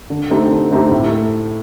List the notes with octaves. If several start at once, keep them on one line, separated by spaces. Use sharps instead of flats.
D3
A3 C4 D#4 G4
D3
A3 C4 D#4 G4
A2
A3